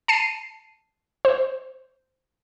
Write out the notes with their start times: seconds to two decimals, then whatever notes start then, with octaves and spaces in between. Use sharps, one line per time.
0.08 A5 C7 D#7
1.25 C5